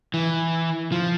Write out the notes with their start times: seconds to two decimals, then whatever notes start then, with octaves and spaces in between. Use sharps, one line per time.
0.14 E3
0.92 F3